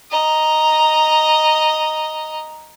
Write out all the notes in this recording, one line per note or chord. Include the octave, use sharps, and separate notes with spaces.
D#5 A#5